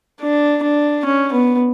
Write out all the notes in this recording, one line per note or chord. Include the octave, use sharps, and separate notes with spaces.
D4
D4
C#4
B3